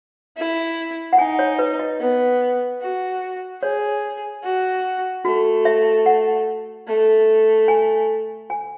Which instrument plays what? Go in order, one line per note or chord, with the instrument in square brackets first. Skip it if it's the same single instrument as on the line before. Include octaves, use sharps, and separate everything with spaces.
[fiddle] E4
[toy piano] F#5
[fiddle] D#4 [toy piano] G#5
[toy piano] C#5
B4
D#5
[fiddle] B3
F#4
[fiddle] G#4 [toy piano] C#5
[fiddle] F#4
[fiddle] A3 [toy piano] F#4
[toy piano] E5
F#5
[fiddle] A3
[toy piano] G#5
G#5